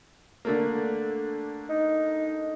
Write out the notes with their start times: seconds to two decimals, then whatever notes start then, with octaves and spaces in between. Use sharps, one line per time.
0.45 D3 A3 A#3
1.70 D#4